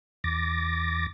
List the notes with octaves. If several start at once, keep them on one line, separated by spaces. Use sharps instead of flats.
E2 D6 A6 A#6